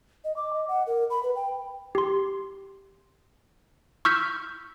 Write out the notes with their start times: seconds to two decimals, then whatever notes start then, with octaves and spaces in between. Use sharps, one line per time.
0.24 D#5
0.36 D6
0.53 D#5
0.68 F#5
0.87 A#4
1.10 B5
1.23 B4
1.35 G5
1.95 G4 C6
4.05 C#6 E6 F6 G6 B6